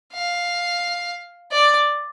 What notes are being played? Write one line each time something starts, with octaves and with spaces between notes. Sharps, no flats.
F5
D5